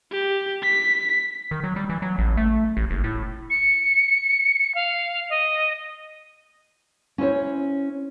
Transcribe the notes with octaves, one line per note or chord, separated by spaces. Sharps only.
G4
B6
D#3
F#3
G3
E3
F#3
A1
A3
A1
F#1
A2
C#7
F5
D#5
C#4 E4 C5 C#5